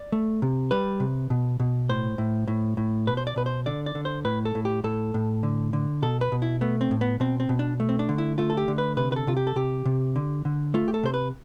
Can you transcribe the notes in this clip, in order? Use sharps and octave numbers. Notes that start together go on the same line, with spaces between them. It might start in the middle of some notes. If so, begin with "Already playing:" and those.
Already playing: D5
A3
C3
G3 B4
C3
B2
B2
A2 C5
A2
A2
A2
B2 B4
C5
D5
B2 B4
C5
D3 D5
D5
D3
C5
A2 B4
A4
A2
G4
A2 A4
A2
D3
D3
B2 A4
B4
B2
E4
A3 B3
C4
A2
B3
B2 C4
C4
B2
D4
A3
C4
D4
D3
E4
A3 F4
A4
G4
D3
B4
C3 B4
B4
A4
C3 F4
G4
A4
C3 G4
C3
D3
D3
A3 F4
G4
A4
C3 C5
B4